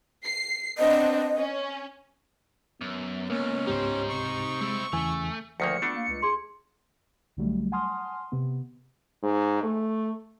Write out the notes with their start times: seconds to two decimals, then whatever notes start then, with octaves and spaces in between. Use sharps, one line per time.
0.24 C7
0.78 B3 C4 D4 D#5
1.36 C#4
2.81 F#2 B3
3.30 C#2 A#3 C#4
3.67 C#2 G#2 D#4 G4 C5
4.09 C3 C#6
4.61 G#3 C4 E4
4.93 E2 C#3 E3 A3 G#5
5.60 D2 D#3 F3 A#3 C#7
5.82 A3 B3 D4 F4
5.95 A#3
6.08 C#2
6.22 D#4 G#4 C6
7.37 B1 D3 F#3 G3 A3
7.72 F#5 G#5 A5 C6 D#6 F6
8.32 C3 B3
9.23 G#2
9.63 A3